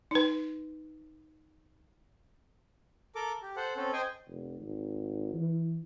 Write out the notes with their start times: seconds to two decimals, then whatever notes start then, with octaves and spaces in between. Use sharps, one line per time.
0.11 D#4 B4
3.15 A4 A#4 D6
3.42 G4
3.56 A4 C5 F#5
3.76 C4 C#4 A4
3.93 C5 D#5 G5 G#5
4.28 F1
4.59 G#1
5.33 E3